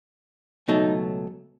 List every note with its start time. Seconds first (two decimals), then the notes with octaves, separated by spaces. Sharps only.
0.68 C#2 B2 F#3 A3 D#4